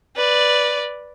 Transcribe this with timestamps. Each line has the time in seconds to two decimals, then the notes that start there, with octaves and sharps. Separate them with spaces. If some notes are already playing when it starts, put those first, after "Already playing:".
0.16 B4 D5